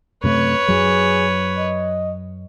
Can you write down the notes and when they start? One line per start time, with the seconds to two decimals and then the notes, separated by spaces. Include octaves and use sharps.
0.24 F#2 C3 A3 B4 C#5
0.68 F#2 F#3 G#4
1.58 D#5